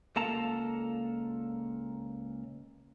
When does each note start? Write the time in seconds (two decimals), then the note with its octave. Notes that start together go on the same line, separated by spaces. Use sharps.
0.16 C#2 A#2 A#3 A4 A5 A#5